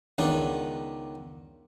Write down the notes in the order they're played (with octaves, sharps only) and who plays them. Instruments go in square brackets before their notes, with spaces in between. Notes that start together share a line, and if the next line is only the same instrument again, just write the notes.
[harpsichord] C#2 D#3 B3 D4